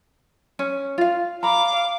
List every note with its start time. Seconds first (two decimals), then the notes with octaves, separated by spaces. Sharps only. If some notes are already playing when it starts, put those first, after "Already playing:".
0.59 C#4
0.98 F4 F5
1.43 F5 A#5 B5 D6